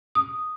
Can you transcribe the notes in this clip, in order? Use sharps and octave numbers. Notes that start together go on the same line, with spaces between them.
D#6